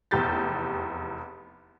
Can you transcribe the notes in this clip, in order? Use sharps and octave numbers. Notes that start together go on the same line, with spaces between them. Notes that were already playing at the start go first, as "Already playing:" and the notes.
F1 E2 G4 G6 A6